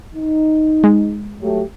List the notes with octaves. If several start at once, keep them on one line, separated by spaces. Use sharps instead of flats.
D#4
G#3
F#3 A3 G4